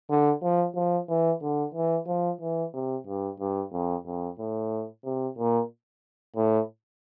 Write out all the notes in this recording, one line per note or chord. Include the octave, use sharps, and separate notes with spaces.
D3
F3
F3
E3
D3
E3
F3
E3
C3
G2
G2
F2
F2
A2
C3
A#2
A2